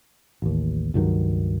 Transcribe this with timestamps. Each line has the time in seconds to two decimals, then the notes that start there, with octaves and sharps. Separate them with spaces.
0.42 A1 D#2
0.94 C#2 G2 D#3 F#3